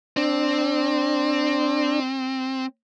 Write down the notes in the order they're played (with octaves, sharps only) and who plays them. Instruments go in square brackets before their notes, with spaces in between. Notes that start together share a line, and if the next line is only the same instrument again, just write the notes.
[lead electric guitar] C4 [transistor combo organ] D4